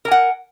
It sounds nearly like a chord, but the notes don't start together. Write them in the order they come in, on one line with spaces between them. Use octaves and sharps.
A#4 G#5 F#5